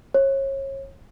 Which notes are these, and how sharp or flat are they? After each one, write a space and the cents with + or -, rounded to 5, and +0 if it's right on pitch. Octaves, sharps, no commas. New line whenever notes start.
C#5 -30